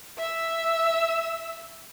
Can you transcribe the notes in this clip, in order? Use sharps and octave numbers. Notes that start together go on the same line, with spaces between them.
E5 E6